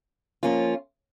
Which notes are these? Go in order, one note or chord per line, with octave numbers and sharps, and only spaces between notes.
F3 A#3 C#4 F4